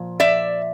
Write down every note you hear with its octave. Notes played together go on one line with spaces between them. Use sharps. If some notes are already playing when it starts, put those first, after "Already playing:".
Already playing: A#2 F3
D5 E5